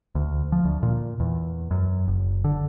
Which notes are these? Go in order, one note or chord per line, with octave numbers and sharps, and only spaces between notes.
D2
F3
D2
A#2
E2
F#2
F#1
D3